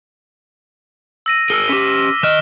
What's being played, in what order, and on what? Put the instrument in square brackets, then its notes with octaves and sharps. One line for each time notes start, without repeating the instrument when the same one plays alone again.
[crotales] E6 A#6 D#7
[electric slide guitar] G#4 A#4 [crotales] E6 F6 G7
[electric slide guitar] C#4 G4 [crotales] D6 B6
[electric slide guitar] D#3 D#5 [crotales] F6 F#6 E7